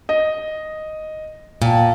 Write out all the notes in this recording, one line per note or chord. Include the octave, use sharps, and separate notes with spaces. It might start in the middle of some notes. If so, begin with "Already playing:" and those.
D#5
A#2 F5 G5 A5